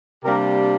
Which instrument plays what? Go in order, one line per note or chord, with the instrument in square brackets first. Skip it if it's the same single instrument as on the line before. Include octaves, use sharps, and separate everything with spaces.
[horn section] C3 G3 A#3 D4 G4 A#4